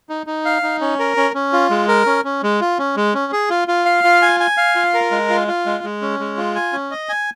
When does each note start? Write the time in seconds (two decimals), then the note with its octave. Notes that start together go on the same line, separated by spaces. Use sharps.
0.09 D#4
0.27 D#4
0.45 F5
0.63 D#4
0.81 C#4
0.99 A#4
1.17 C#4
1.34 C#4
1.53 F4
1.70 G#3
1.88 A#4
2.06 C#4
2.25 C#4
2.43 G#3
2.61 F4
2.78 C#4
2.97 G#3
3.14 C#4
3.32 G#4
3.50 F4
3.68 F4
3.85 F5
4.04 F4
4.22 G#5
4.40 G#5
4.57 F5
4.76 F4
4.94 A#4
5.11 G#3
5.29 F4
5.48 F4
5.66 G#3
5.84 G#3
6.02 C#4
6.19 G#3
6.37 F4
6.55 G#5
6.73 C#4
6.91 D#5
7.09 G#5